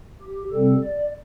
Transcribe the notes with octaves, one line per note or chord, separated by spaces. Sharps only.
G4
C3 G3 C4 A4
D5